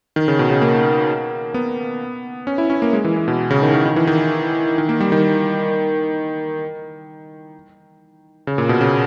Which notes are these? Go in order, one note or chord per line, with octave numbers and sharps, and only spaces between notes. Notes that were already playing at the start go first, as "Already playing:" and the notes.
D#3
C#3
B2
C#3
A#3
B3
C#4
E4
C#4
A#3
G#3
E3
E3
B2
C#3
D#3
D#3
D#3
E3
D#3
D#3
A#3
G3
D#3
C#3
A#2
B2
C#3